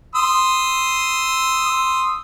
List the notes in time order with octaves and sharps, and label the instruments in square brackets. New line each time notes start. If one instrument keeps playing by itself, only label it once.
[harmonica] C6 D#6 E6